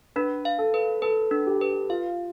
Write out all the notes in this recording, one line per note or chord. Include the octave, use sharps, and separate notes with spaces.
D4 B4
F5
A4
B4
A4 B4
D4
G4
B4
F4 F5